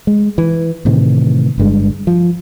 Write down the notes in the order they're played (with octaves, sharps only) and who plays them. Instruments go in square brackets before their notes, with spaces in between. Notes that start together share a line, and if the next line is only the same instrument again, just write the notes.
[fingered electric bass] G#3
E3
A2 C3 D#3 E3
G1 G2 G#3
F3